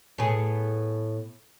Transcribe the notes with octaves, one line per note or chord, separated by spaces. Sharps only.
A2 B3 G#4